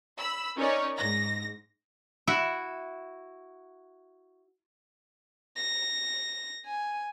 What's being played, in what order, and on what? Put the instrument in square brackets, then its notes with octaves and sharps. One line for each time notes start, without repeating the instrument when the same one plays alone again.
[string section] B5 E6
C#4 D#4 A#4 C#5 D5
G#2 A#6
[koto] E4 F#4 E5
[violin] A#6
G#5